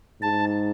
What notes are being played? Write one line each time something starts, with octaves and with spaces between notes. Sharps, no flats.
G#2 A5